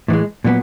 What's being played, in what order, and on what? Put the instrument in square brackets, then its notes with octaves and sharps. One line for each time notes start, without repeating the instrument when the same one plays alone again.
[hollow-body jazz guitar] A2 E3 G#3
A#2 F#3 B3